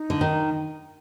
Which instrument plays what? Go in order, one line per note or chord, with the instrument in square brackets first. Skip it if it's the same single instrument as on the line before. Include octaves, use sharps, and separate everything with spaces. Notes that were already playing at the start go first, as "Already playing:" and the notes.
Already playing: [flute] D#4
[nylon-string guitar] D3
D#3